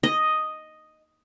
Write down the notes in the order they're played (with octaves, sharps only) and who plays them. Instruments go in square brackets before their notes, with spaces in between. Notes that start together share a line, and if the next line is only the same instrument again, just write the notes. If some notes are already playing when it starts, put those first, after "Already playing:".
[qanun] D#5